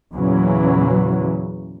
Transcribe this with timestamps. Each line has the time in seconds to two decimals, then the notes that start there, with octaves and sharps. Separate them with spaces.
0.14 E2 A#2 C#3 E3 F#3